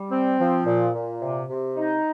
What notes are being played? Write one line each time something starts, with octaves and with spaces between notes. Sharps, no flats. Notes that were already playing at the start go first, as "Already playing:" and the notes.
Already playing: G3
C4
F3
A#2
A#2
C3
C3
D#4